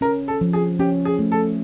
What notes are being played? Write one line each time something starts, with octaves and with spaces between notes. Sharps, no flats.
C#4 A#4
A4
F3
G#4
C#4 G4
G#4
A3
A4